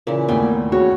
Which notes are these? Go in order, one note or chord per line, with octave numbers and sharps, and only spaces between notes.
A#2 C#3 E3
D#2 A2 B3 G5 G#5
C#3 F#4 C#5